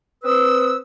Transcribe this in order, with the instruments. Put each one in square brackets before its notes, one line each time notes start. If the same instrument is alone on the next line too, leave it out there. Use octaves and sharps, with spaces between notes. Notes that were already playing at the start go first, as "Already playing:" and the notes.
[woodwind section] C4 B4 D#6 E6